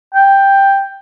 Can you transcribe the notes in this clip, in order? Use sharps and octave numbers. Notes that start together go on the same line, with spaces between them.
G5